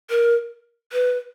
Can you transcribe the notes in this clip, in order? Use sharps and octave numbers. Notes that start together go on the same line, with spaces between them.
A#4
B4